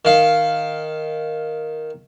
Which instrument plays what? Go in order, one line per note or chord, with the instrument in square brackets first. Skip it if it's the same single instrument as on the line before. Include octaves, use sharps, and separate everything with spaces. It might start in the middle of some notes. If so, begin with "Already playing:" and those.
[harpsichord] D#3 F5